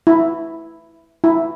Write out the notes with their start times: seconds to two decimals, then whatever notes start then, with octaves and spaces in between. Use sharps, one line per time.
0.07 E4
1.24 E4